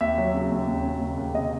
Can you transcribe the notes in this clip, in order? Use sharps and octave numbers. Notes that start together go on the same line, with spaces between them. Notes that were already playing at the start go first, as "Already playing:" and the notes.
D#2 E5
F#3
C#3
D#2
D#2
C#3
D#2
D#2
C3 D#5